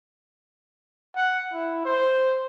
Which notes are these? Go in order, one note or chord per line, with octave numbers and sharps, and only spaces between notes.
F#5
E4
C5